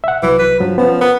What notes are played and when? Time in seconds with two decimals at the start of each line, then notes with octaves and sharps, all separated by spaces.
0.04 E5 F#5
0.23 C2 E3 F#3
0.39 B4
0.60 G2 F3 F#3
0.78 F3 B3 C#4
1.01 B3 A#4